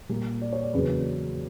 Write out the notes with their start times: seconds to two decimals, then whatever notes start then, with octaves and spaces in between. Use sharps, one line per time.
0.09 A#2 G3 A#3
0.42 D5
0.53 C#5
0.63 D5
0.74 E2 C#3 F#3 A#3 B4